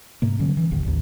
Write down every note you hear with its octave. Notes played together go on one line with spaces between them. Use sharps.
G#2 C3 A#3
D3 F#3 C#4
E3
E1 A1 D#2 D3
A1 D#2